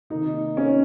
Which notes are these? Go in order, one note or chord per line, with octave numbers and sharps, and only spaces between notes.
C3 D#3 A#3 D#4
C#4